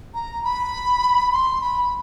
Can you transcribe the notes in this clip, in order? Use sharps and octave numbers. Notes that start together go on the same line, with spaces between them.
A#5
B5
C6
B5